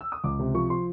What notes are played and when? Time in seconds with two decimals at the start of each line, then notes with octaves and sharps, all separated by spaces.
0.01 E6
0.12 D#6
0.24 C#2 D6
0.39 C3
0.54 F3 C#6
0.70 F3 C6